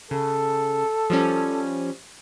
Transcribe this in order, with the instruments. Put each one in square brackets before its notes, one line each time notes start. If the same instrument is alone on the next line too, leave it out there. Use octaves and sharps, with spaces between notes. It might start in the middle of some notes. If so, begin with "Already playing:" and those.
[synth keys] C#3 [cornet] A4
[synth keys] F3 G3 C#4